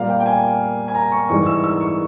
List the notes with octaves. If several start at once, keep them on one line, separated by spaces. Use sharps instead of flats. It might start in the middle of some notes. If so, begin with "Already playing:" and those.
Already playing: A#2 G3 A#3 F5
G5
G5
G#5
G#5
A#5
C#6
G#2 E3 G3 C#6
E6
E6
C#6